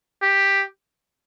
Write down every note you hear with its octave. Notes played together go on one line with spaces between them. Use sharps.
G4